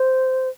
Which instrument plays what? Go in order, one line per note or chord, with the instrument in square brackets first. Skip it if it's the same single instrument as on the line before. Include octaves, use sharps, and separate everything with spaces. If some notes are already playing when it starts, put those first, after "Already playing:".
Already playing: [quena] C5